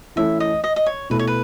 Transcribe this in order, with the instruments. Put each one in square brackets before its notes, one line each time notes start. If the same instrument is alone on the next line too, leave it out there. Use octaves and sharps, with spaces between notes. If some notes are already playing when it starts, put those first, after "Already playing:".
[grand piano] E3 A3 C#4 E4 A4 [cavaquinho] E5
[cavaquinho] D#5
D#5
D#5
C#5
[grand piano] B2 A3 E4 A4 [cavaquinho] B4
[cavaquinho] C#5
B4